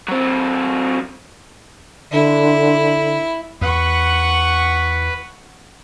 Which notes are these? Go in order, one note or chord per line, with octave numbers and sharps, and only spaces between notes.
F#3 C4
D3 E4
E2 B4 F#5 C#6